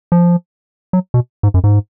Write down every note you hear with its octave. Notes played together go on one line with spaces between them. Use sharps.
F3
F#3
B2
G#2
F#2
G#2